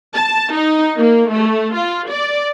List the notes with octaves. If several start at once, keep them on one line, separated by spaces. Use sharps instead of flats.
A5
D#4
A#3
A3
F4
D5